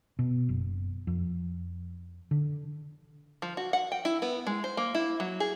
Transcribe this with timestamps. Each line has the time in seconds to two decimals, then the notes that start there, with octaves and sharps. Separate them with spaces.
0.19 B2
0.49 F#1
1.07 F2
2.31 D3
3.42 F3
3.57 F#4
3.73 F#5
3.92 G5
4.05 E4
4.22 B3
4.47 G#3
4.64 C5
4.77 A#3
4.95 E4
5.20 F#3
5.40 G#4